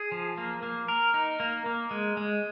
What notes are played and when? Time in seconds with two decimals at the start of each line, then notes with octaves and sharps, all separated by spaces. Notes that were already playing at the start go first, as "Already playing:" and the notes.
Already playing: G#4
0.12 F3
0.37 A#3
0.63 A#3
0.88 A#4
1.14 D#4
1.40 A#3
1.66 A#3
1.91 G#3
2.17 G#3